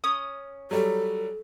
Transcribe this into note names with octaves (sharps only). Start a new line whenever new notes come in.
C#4 D#6
F#3 G3 A4